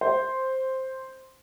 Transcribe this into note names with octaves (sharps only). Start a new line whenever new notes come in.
C5